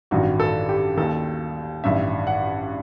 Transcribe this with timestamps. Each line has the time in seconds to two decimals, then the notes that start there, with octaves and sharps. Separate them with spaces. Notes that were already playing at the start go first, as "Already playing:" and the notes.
0.11 A1 G2 D#3 F#4
0.40 A4
0.69 G4
0.97 D#2 D#3 A4
1.84 A1 G2 D#3 E5
2.27 F#5